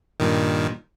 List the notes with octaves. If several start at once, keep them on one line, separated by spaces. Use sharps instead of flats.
G2 A#2 D#3